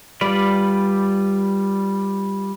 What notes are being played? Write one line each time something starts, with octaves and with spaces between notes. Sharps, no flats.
G3 F4 B4 D5